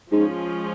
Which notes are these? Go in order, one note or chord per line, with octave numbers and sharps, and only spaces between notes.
G#2 F3 G#3 C#4 F4